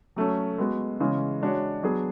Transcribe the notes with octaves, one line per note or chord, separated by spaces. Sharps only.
F#3 A3 C#4
G#3 B3 F#4
C#3 E3 G#3 C#4
G#3 D4 F#4 C#5
F#3 B3 D4 G#4